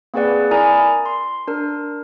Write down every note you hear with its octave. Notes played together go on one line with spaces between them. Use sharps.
A#3 C4 G#4 B4 D5 F#5
E4 A#4 D5 G#5 A#5 D#6
C6
D4 A#4